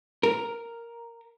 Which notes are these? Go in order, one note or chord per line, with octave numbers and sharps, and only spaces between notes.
A#4